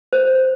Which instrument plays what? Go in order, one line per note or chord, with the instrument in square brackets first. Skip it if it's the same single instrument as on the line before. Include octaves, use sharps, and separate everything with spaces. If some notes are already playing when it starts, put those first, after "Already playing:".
[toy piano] C5